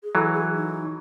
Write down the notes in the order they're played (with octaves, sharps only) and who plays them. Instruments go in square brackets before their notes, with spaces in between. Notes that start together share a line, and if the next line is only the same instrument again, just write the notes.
[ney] G#4
[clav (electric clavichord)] E3 F#3 [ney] A4
[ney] G#4
D#4